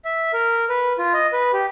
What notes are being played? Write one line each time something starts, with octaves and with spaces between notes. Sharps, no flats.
E5
A#4
B4
F4
D#5
B4
G4